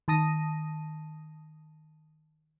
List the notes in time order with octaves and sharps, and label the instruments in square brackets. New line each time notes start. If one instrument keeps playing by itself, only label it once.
[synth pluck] D#3 A5 D#6 A#6 D#7